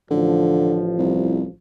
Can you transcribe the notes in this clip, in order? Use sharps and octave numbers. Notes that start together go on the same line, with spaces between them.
A1 D3 F3
C2